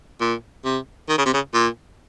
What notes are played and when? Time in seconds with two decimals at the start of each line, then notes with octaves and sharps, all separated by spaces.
0.20 A#2
0.65 C3
1.09 D#3
1.18 C#3
1.25 C3
1.33 C#3
1.54 A#2